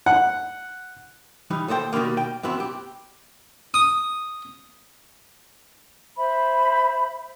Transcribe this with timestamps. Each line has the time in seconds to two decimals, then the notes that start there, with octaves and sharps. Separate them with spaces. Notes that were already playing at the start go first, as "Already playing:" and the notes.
0.06 F#5
1.50 E3 G3 D#4
1.68 D#2 A4 C5 D5 G5
1.93 B2 D#3 G3 G#3 A#3
2.17 G5
2.43 F#2 E3 B3 C4
2.60 G4
3.74 D#6
6.17 C5 E5 B5